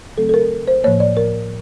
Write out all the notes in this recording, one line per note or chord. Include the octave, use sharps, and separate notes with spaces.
C#3 F#3 A3 C4 A4
A4
A#4
C5
A2 F3 A#3 C#5
D5
A#4